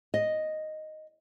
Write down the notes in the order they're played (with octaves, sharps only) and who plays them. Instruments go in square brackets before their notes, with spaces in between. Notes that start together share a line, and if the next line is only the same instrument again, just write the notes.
[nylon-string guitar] D#5